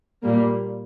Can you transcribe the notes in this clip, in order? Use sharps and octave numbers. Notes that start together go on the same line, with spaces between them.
A#2 G3 A#3